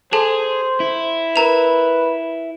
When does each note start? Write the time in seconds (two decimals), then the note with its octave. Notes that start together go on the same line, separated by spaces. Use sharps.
0.13 G#4 A4 C5 A5 F#7
0.80 E4
1.36 A#4 B4 A#5 F7